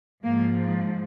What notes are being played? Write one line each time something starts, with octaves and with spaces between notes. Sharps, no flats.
G#2 F3 A#3